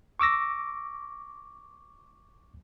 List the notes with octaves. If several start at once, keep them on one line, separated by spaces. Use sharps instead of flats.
C#6 D6 E6 A#6